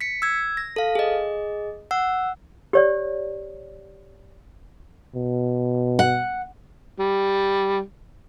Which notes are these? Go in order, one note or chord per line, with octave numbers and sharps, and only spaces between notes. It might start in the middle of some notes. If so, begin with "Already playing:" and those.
B6 C#7
E6 G#6
A#6
A4 F5
G#4 D#5
F#5 E6
G4 C#5 D5
B2
F#5
G3